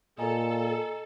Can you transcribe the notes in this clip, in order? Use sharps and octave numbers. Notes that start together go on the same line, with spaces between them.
A#2 A4 D#5 G#5 A#5